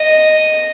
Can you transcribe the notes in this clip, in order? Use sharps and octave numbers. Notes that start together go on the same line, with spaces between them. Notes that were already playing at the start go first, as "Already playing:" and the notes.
Already playing: D#5